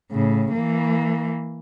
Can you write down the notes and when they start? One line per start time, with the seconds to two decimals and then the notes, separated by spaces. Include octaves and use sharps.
0.12 A2 C#3
0.53 E3 A#3